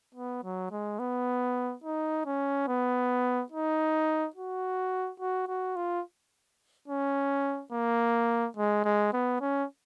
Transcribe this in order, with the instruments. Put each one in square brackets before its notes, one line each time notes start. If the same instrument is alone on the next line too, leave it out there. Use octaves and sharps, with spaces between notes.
[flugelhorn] B3
F#3
G#3
B3
D#4
C#4
B3
D#4
F#4
F#4
F#4
F4
C#4
A#3
G#3
G#3
B3
C#4